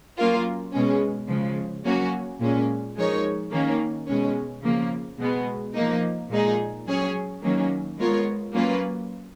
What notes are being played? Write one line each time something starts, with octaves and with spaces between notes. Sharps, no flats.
F#3 A#3 C#4 F4 A#4
B2 G#3 C#4
C#3 F3 G#3
F#3 A#3 C#4 F#4
A#2 G#3 C#4
F3 G#3 D#4 A#4 C#5
D#3 A#3 C#4
B2 G#3 C#4
C#3 F3 A#3
B2 G#3 B3
F3 A#3 D#4
A#2 G#3 D#4 G#4
F#3 C#4 G#4 C#5
D#3 F#3 A#3 C#4
G#3 B3 F4 A#4 C#5
F#3 A#3 C#4 F4 B4